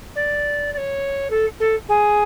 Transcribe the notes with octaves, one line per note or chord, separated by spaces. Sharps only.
D5
D5
C#5
A4
A4
G#4